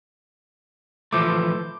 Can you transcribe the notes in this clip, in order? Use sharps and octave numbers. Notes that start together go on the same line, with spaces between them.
E3 F3 A3 D6 G6